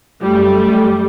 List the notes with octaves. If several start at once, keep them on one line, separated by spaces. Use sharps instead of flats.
F#2 G3 A3